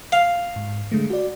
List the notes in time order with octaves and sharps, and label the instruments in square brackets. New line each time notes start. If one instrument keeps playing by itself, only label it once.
[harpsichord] F5
[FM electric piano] G#2
D3 G#3 A3
F#4 D5